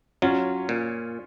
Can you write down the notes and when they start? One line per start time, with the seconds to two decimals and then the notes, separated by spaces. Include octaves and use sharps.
0.22 F#3 C#4 F4
0.69 A#2